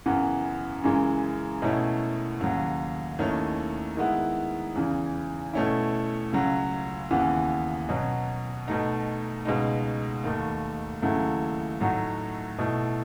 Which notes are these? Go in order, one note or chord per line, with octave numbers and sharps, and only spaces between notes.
F#2 C#3 E3 B3
F#2 C#3 E3 G#3
B2 A3 C#4 E4
D#2 C#3 F#3
D#2 D#3 A3 C#4 E4
D#3 G#3 B3 E4
E2 C#3 E3
B2 A3 C#4 E4
C#2 C#3 F#3
D#2 C#3 E3 B3
B2 F#3 C#4
B2 A3 D#4
C#2 B2 G#3 D#4
D#2 D#3 A3
D#2 C#3 F#3 A3 E4
A2 F#3 A3 D#4 F#4
B2 A3 E4